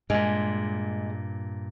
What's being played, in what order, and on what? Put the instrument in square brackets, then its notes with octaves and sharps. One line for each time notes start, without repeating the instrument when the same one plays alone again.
[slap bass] G2 A#2 [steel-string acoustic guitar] G#3